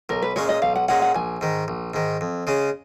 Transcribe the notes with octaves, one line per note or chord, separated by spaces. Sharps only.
B1 A#4
B4
A#2 G#3 C#4 C#5
D#5
B1 F5
F#5
A#2 G#3 C#4 F#5
F#5
A#1 G#5
G#2 D#3
A#1
G#2 D#3
F2
C#3 G#3 C#4